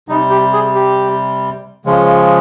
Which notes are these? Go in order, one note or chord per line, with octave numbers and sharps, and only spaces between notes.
C3 G3 D#4
G4
G#4
G4
C#3 F3 G#3